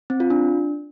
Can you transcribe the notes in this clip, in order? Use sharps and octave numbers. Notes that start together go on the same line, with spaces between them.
C4
F4
D4